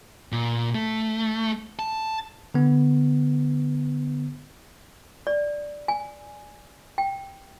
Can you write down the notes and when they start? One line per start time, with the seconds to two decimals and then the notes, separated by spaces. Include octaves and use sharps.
0.32 A#2
0.75 A3
1.79 A5
2.54 D3 B3
5.27 D5
5.88 G#5
6.98 G5